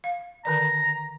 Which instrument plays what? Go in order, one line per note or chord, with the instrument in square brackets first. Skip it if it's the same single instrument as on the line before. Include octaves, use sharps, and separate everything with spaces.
[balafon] F5
[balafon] D3 D#3 D5 [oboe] A#5